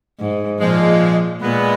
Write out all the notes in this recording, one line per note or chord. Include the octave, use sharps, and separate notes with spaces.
G#2
A#2 F3 G#3
A#2 G#3 B3